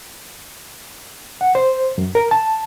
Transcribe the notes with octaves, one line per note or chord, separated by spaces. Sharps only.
F#5
C5
F#2
A#4
A5